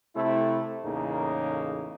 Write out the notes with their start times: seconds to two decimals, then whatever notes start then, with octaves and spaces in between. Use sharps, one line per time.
0.16 C3 A3 C4 E4
0.85 E2 A2 C#3 A#3 D#4